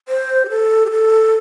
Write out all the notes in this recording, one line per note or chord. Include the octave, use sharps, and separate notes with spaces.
C5
G4
A4
G4
A4